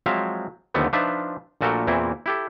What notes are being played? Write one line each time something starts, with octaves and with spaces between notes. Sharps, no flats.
F3 F#3 G#3 C4 E5 F5
D#2 D3 F3 A3 B3 C4
F3 D4 D#4 F4 B4 E5
A#1 A#2 A3 F#4 A4 A#4
E2 A#2 E3 C4 E4
E4 G4 A4